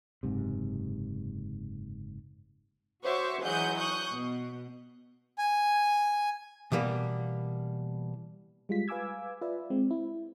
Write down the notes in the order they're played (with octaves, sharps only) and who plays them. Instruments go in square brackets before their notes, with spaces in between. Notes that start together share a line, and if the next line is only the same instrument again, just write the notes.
[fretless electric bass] F#1 G#2 C3
[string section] F#4 C5 C#5 E5 C#6 D6
E3 F#3 G#3 F#5 D#6 G6
C#6 D#6 F#6 G6
B2
[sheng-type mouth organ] G#5
[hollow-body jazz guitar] B2 E3 G3 A#3
[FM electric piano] G3 G#3 F4 B6
B4 F5 G#5 D6 E6 G#6
F4 B4 D5 E5
G#3 C4
E4